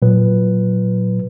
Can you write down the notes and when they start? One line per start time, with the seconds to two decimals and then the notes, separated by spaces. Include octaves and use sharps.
0.02 A#2 F#3 B4